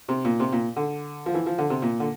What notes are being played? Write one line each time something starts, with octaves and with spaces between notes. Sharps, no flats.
C3
A#2
C3
A#2
D3
F3
E3
F3
D3
C3
A#2
D3